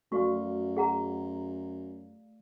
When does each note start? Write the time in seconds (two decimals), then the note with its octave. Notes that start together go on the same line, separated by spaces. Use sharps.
0.12 F#2 A3 F#4 D5 F5 C#6
0.77 G#4 F#5 A#5